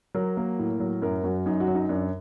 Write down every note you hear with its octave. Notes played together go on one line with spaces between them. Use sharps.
F#3 A#4
A#3
A2
F#3
F#2 A#4
F#2 F#4
F#2 D#4
F#4
F#3
D#4
F#2 D4